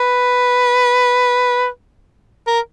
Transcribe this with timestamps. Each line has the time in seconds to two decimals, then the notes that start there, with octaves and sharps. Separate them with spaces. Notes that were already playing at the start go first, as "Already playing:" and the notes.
Already playing: B4
2.47 A#4